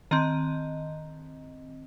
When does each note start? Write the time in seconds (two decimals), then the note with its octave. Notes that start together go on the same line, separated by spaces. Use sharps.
0.11 D#3 C4 D#5